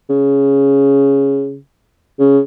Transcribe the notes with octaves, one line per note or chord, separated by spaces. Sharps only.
C#3
C#3